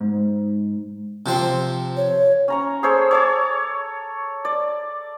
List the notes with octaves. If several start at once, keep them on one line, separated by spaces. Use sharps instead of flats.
G#2
C3 F3 C4
C#5
C#4 A#5 C#6
G#4 A4 C5 C#5
C#5 A5 D6
D5